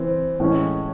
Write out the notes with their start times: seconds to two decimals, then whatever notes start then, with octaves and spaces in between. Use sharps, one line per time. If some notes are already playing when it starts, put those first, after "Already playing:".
Already playing: E3 C4
0.40 A2 E3 G#3 C#4